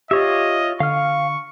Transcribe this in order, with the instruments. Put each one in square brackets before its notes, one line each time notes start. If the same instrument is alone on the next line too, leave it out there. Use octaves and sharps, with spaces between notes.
[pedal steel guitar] F4 C#5 E5 [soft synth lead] G4 [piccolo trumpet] D#5
[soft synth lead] D3 [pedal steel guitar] F5 F6 [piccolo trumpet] C#6